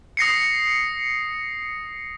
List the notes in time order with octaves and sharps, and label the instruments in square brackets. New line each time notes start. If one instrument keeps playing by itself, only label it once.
[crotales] D#6 A#6 C7 C#7